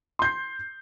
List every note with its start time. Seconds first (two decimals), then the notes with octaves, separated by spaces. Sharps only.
0.19 C6
0.22 G6
0.24 C7